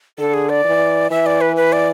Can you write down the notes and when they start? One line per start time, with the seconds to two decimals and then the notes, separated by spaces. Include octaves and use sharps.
0.18 D3 A4
0.34 G#4
0.49 D5
0.64 E3
1.10 E3 E5
1.26 D5
1.41 B4
1.56 B4
1.73 D5